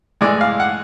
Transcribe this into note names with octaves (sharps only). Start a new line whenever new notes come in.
A2 E3 G#3 D5
F5
F#5